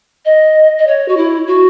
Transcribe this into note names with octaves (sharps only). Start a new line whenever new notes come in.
D#5
D#5
C#5
F#4
E4
F#4